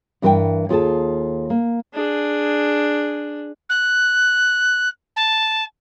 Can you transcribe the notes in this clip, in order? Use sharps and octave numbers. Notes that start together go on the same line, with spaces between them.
G2 E3 A#4 C5 F#5 G5
D#2 F4 G#4 A4 A5
A#3
D4 G#4
F#6
A5